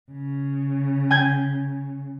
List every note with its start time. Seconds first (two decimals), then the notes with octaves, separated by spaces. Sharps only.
0.11 C#3
1.11 G#5 G6 G#6